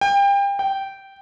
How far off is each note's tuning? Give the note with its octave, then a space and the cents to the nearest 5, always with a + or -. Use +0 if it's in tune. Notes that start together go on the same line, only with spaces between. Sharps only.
G5 +30
G5 -10